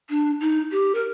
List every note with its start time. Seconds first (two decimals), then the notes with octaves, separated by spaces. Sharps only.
0.10 D4
0.41 D#4
0.71 G4
0.95 A#4